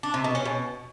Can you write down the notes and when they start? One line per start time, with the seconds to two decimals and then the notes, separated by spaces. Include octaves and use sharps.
0.03 D4
0.14 C3
0.24 B2
0.35 C#4
0.45 B2